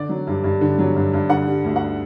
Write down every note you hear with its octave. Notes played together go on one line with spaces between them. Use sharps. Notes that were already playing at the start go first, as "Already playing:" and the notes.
Already playing: D3 D5
F#3
G2
G2
D3
F#3
G2
G2
D3 F#5
G3
D2
F#5